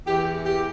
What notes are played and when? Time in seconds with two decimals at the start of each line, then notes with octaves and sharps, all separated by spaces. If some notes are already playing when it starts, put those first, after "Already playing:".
0.06 E2 E3 G4
0.45 G4